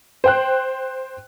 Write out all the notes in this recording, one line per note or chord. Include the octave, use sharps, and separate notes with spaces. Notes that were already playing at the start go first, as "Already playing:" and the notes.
C5 G5 F#6